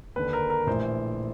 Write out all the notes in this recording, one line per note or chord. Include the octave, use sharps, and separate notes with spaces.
D#2 D3 B4
A#4
A#4
A#1 A2 E3 C5